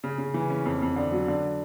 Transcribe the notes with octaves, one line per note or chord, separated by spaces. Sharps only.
C#3
C#3
E3
C#4
F2
F2
D3
F#3
D3